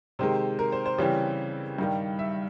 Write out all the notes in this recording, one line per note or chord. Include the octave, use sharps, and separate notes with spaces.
C3 D#3 G#3 C5
A#4
C5
C5
C#3 E3 G3 C4
G2 D#3 G3
E5